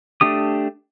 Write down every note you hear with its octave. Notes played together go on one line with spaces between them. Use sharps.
A3 D4 G4 D#6